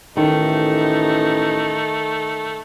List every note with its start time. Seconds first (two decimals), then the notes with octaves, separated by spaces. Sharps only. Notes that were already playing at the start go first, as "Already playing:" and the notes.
0.17 A1 D#3 A3 D#4